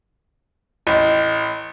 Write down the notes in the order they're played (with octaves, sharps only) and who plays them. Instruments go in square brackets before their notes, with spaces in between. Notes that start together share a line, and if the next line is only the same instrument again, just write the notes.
[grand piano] A1 [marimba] D#5